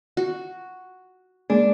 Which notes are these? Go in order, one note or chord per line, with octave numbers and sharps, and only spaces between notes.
F#4
G#3 A#3 D4 G#4